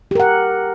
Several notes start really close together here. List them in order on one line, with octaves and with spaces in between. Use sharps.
G4 A#4 F#5